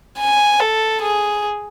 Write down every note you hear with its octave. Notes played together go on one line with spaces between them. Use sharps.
G#5
A4
G#4